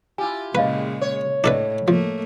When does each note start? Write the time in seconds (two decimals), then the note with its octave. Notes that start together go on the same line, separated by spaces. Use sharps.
0.18 E4 F4 G4 G#5
0.55 A#2 C#3 G#3 B4 D#5 F5 B5
1.01 C#5
1.44 A2 D4 A4 B4 D#5 E5
1.88 F3 A3 A#3